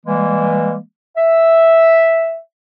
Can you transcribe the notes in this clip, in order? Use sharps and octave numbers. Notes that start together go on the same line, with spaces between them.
E3 G3 G#3 A#3
E5